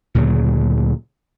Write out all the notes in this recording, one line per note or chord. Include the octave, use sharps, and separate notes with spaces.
D2 A#2 C#3 F#3